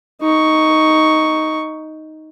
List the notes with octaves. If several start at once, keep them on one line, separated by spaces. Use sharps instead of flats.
D#4 C#6